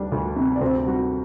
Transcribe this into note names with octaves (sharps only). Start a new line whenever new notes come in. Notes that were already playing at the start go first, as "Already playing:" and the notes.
Already playing: D2 G3 D4
D2
C3
D5
D2 C4 C5
G3 F#4